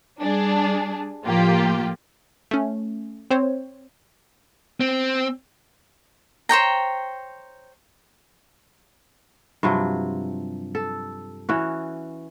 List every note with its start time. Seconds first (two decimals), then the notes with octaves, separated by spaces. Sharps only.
0.20 G3 D4 G#4
1.25 A2 F3 A#3 F4 G4
2.51 A3 C#4
3.30 C4 C5 C#5
4.81 C4
6.49 C5 C#5 G5 A#5
9.63 G2 C3 F3 F#3
10.75 A4
11.49 E3 C#4 F#4